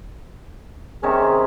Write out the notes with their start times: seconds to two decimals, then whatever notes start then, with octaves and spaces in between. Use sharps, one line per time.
1.03 C3 D#3 C#4 G#4